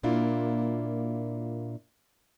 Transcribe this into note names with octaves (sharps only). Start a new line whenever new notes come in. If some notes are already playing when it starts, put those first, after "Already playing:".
A#2 A#3 D4 E4 F4